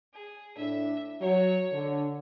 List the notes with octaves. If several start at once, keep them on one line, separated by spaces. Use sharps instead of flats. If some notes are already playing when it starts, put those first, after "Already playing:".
G#4
A2 D4 E5
F#3 C#5
D3